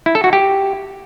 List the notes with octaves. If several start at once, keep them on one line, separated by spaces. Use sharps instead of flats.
E4
A4
F#4
G4